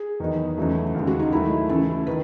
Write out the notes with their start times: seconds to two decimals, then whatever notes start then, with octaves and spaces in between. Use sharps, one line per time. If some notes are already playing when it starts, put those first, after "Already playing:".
Already playing: G#4
0.20 E2 D#3 F#3 B3 D#4
0.58 E2 C#3 F#3 A3
0.95 D#2 C#3 G#3
1.07 F#4
1.19 D#4
1.32 D#3 F#3 A3 E4
1.69 C#3 E3 A3 E4 A4
2.07 D#3 B4